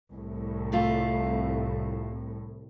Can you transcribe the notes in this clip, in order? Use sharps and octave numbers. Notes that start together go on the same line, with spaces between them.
C2 A2
C3 A3 F4